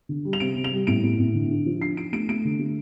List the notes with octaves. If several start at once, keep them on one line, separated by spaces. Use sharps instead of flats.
D3
G3
F7
C3 D7
C3
F7
G3
A2 D7
A2
A2
D3
D4
F3
D4 C7
D4 D7
A3 D7
A3 D7
D3
A3